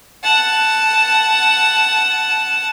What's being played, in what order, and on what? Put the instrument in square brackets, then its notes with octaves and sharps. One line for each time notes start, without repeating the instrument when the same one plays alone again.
[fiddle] F#5 A5